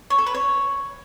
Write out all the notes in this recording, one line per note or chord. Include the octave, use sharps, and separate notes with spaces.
C#5
A4
B4
C#5